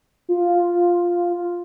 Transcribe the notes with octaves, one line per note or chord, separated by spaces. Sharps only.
F4